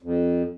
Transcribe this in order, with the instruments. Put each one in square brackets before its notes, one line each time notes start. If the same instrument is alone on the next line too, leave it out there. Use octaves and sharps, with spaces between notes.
[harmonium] F2